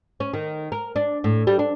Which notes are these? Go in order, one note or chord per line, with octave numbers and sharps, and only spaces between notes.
C#4
D#3
A#4
D4
A2
G3
D4